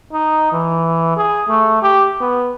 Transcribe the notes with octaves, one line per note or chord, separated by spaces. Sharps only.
D#4
E3
G#4
A3
G4
B3